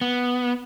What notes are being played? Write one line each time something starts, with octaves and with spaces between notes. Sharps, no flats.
B3